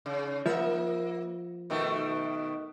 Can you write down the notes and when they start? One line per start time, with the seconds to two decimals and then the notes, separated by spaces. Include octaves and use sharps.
0.06 C#3
0.46 F3 A#3 E5
1.70 B2 D#3 A3